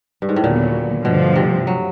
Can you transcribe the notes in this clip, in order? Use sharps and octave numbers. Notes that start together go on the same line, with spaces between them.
G2
G#2
A2
D#2 A#2 D3 F#3 B3
G2 B2 D3 F3 A3 D4
C3
F#3